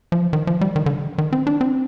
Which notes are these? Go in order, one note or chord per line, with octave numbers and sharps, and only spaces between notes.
F3
D#3
F3
G3
D#3
D3
D#3
C4
D4
C4